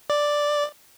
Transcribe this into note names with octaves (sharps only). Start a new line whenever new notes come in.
D5